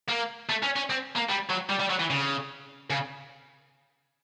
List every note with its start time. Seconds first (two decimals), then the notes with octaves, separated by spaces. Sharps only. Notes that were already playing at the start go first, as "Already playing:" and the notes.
0.09 A#3
0.49 A3
0.63 C#4
0.76 C#4
0.90 C4
1.16 A#3
1.30 G3
1.50 F#3
1.70 G3
1.80 G3
1.90 F#3
1.99 E3
2.10 C#3
2.90 C#3